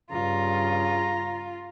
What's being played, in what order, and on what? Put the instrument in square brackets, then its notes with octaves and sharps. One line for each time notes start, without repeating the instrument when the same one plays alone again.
[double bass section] G2 [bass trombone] C#3 [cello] F4 [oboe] A#5